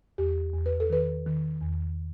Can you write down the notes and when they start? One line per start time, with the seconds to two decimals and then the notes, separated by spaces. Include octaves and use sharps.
0.18 E2 G4
0.54 E2
0.66 B4
0.80 A4
0.90 D#3 B4
1.26 D#3
1.61 E2